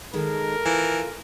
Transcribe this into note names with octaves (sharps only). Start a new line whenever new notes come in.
D#3 G#3 A4 A#4
E3 F4